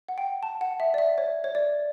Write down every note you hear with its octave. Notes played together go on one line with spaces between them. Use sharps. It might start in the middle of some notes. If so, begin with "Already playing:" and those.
F#5
G5
A5
F#5
E5
D5
E5
C#5
C#5
D5